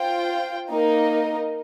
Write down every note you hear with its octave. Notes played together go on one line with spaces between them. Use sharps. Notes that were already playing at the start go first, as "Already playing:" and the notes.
Already playing: F4 C5 G5
A#3 D#4 A#4 D#5